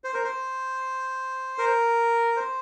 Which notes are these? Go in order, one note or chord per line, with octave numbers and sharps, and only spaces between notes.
C5
A#4
C5
A#4
C5